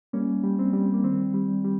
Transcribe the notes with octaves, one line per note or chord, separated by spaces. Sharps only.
G3 A#3 C#4
G3
C4
G3
A#3
D#3 C4
G3
G3